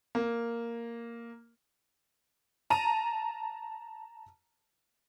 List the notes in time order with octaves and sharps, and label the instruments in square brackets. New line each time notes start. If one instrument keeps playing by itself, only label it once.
[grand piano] A#3
[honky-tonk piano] A5 A#5 D#7